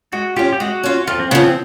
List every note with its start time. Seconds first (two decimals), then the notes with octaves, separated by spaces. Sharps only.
0.12 G#3 F#4
0.36 C#4 F4 G4
0.53 G4
0.60 G#3 F#4
0.84 C#4 F4
1.07 F2 F4
1.19 C4
1.31 C#3 F3 B3
1.43 C4